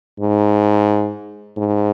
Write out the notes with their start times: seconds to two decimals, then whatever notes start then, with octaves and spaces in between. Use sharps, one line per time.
0.20 G#2
1.57 G#2